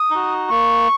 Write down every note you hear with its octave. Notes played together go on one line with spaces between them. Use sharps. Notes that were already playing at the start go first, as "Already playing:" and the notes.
Already playing: D#6
D#4 F#4
A#3 C#6